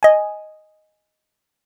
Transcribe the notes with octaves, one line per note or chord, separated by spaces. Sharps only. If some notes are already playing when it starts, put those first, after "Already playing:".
D#5 G#5